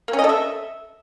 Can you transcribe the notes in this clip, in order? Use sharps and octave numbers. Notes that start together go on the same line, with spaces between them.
A#3
C#4
D#5
A4
E5